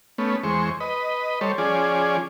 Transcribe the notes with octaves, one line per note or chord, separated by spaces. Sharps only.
A3 B3 C#4
E2 G#3 C5 C#6
B4 D#5
G3 A4 C5 C#5
F3 C#4 G#4 D5